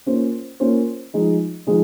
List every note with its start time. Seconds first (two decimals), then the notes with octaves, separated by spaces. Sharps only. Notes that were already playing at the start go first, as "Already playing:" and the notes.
0.06 A#3 C#4 F4 C5
0.60 A#3 C#4 F4 C5
1.14 F3 G#3 D#4
1.67 F3 G#3 D#4